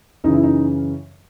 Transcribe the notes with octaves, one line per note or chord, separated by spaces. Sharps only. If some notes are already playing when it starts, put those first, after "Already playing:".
F#2 C#3 E3 D#4
E4
D#4